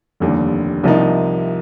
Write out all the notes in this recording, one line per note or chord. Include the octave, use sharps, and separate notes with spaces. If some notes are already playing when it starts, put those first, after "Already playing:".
F1 D#2 D3 G3
C2 C3 F3 A#3 D#4